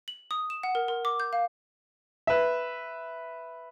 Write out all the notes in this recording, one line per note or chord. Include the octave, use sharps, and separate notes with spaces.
F#7
D#6
E7
F#5
A#4
A#4
D6
G6
F5
B4 E5